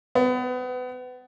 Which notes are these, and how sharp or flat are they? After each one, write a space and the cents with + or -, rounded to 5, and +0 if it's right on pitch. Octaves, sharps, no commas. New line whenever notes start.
B3 +30